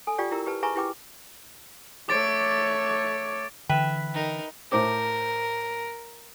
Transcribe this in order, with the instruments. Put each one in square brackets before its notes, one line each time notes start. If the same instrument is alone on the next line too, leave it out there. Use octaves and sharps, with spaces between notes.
[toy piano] A4 G#5
F4 G4 D5 G5
E4 G4 A#4 A#5 E6
G4 B4 A5
G#4 B4 E5 G#5 A#5 C#6
E4 G4 B4 G5 D6
[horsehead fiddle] A3 C#5 [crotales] D6 A6 D7
[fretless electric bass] D3 E3 [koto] B4 E5 [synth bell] G5
[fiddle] D#4 A#4
[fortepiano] A2 C5 D6 [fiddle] A#4